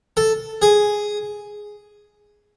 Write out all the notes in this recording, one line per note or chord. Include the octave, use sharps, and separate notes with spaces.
A4
G#4